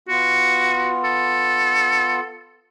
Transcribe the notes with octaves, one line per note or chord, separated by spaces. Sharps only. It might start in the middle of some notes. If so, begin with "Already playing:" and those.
B3 F4 F#4
A4